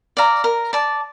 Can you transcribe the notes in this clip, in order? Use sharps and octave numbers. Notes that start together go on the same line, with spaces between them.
D5 F5 A#5
A#4
D5 A5